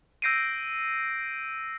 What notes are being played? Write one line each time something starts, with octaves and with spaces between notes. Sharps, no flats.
E6 G6 A#6 C7 D7 D#7